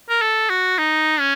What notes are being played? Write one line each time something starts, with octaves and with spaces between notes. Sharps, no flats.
A#4
A4
F#4
D#4
C#4